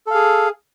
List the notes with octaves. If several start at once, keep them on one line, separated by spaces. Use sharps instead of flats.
G#4 A4 F5